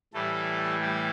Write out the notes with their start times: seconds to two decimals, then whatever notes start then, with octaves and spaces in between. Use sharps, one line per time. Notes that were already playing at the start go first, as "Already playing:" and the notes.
0.14 A2 E3 G3 A3 A4
0.81 G3 G4